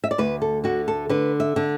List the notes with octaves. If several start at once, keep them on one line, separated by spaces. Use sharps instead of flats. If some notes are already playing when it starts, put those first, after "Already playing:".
E5
D5
D2 B4
A4
D3 F#4
A4
D3 B4
E5
D3